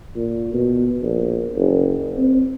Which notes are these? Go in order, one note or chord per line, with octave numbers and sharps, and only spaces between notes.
A#2
B2
A#1
F#1
C4